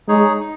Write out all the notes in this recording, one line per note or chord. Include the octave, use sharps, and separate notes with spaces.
G#3 D#4 G#4 C#5
D#4